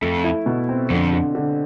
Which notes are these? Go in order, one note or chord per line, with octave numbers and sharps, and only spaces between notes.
F2 A3
E4
B2
C4
F2 D3
D3
D3